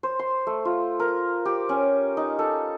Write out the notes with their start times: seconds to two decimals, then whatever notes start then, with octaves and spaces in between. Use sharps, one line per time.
0.03 C5
0.19 C6
0.47 A3
0.65 F4
1.00 A#4
1.45 G4
1.69 C#4
2.17 D#4
2.39 A4